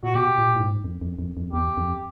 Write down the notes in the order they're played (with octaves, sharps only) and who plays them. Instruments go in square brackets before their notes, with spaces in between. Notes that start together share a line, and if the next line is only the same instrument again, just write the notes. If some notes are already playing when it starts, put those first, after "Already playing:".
[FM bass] A#2 [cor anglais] F#4
[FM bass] B2 [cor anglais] G4
[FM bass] A#2
A2
G#2
F2
F2
F2
F2
[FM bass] E2 [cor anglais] G4
[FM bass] F2